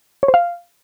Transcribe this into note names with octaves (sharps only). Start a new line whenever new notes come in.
C#5
C5
F5